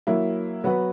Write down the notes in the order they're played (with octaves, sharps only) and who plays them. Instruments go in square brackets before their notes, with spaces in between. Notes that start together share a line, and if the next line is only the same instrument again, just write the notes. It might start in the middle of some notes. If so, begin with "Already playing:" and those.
[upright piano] F#3 A#3 E4
F#3 B3 F#4 B4